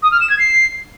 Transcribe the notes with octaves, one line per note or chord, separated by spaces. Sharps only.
D#6
F6
E7
G#6
C7